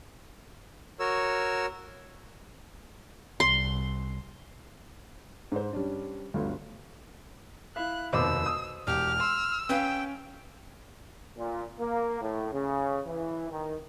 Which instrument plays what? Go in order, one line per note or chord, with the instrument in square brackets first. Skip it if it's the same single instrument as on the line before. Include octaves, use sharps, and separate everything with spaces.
[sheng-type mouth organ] F#4 A#4 C#5 E6
[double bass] C2 [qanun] C6
[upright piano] G#2 C5
G3 C#4 D4
G1 D2 G2
[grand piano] E4 E5 F5 [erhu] F#6
[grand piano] F1 D#2 B4 [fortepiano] B2 C5 D6 [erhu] E6
[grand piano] D#6
[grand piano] E1 [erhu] G4 [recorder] F6
[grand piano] C6 [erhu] E6
[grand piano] C#4 [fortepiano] B4 F5 [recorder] G5
[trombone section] A#2
A#3
A2
C#3
E3
D#3